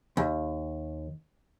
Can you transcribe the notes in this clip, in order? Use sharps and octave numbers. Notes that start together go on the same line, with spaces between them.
D#2